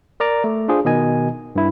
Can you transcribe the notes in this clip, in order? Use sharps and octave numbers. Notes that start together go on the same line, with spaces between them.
A#4 D5 A#5 D6
A3
D4 F4 G#4 C5
B2 D#3 D#5 G#5
G2 E4